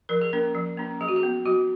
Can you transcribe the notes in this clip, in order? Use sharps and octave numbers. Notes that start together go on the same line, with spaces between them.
F3 A#4
G#4
A#3 C#4 A#4
F3
A#3 C#4
F#3 G#4
F#4
G#4
B3
F#3 F#4